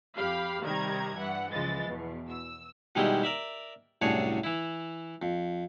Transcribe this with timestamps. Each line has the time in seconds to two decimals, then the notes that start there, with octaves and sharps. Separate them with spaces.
0.16 F2 G4 F5 B5 C7
0.63 C3 D#3 G3 A#5 G#6
1.16 G2 E3 F#5
1.52 C#2 C#3 E3 F3 G#3 A6
1.85 E2 B2
2.29 E6
2.95 B2 D#3 G3 G#3 E4 G4
3.23 A#4 D5 E5
4.02 C2 F#2 A2 D4 G#4 C#5
4.44 E3 E4
5.22 F2